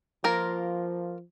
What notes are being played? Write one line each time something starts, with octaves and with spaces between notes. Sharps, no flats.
F3 A#3 F4 A#4